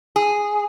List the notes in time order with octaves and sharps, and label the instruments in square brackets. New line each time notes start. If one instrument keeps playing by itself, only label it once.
[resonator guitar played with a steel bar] G#4